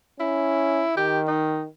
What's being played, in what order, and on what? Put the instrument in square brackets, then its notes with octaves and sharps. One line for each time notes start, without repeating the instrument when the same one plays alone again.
[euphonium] C#4 [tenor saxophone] E4
[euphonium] D#3 [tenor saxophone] G4
[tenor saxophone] D#4